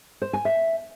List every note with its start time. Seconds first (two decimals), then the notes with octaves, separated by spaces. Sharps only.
0.22 C5
0.33 G#5
0.45 E5